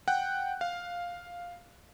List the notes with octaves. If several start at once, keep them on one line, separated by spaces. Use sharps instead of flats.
F#5 G5 F#6
F5